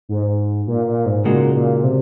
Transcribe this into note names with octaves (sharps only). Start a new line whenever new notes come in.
G#2
A#2
A#2
G#2
C#2 A#2 C#3 G#3 D#4 F#4
A#2
C3